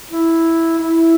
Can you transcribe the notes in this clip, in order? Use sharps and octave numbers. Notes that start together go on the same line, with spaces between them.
E4
E4